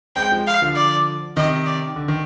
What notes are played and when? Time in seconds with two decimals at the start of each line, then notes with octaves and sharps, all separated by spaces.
0.16 G#3 C4 G5
0.31 F3 G#3
0.47 F5
0.62 D3 F3
0.76 D5
1.36 C3 D#3 D#5
1.65 D5
1.96 D3
2.08 D#3